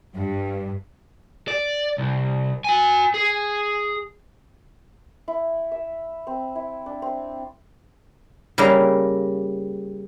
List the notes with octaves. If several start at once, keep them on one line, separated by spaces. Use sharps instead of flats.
G2
D5
C2
F#4 G#5
G#4
E4
E5
C4
E4
D4
C4
C#3 G3 A#3 E4 A#4